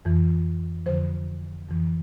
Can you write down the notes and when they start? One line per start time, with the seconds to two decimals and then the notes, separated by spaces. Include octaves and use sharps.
0.05 F2 E3
0.86 F2 D3 F3 C5
1.68 F2 E3